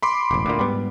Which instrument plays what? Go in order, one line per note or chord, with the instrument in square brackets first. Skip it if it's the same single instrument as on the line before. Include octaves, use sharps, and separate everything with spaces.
[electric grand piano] B5 C6 D6
[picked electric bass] E1 A1
D2 A#2
G#2 G3 B3